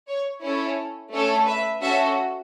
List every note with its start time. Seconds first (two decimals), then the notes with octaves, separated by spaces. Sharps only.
0.08 C#5
0.43 C#4 E4 A4 C#5
1.13 A3 C#4 A4 C#5
1.48 B4 E5
1.82 C#4 F#4 A4 E5 A5